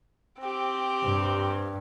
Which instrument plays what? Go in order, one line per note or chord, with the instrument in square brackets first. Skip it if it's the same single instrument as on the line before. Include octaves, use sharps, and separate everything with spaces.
[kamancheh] C4 G4
[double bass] G2